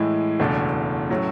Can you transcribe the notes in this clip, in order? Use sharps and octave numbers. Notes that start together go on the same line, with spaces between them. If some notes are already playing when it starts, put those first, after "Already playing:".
Already playing: A2 E3 G#3
F#1 E2 B2 A3 D4
A2 F#3 A3 C#4